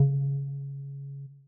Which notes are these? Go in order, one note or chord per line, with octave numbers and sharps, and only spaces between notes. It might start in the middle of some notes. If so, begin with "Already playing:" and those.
Already playing: C#3